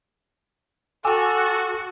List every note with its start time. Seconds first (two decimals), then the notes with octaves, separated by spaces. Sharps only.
1.05 F#4 A4 G5 G#5 D6 E6